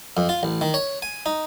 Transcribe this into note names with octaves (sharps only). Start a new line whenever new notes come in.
F2
F4
A1
D#3
C#5
G#5
D#4